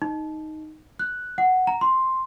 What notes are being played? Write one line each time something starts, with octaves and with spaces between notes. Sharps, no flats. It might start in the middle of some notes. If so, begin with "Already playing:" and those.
D#4
F#6
F#5
A#5
C6